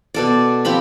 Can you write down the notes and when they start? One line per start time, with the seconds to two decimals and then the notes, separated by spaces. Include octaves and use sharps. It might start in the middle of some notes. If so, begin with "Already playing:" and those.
0.14 B2 A4 D5
0.65 F3 C4 G4 B5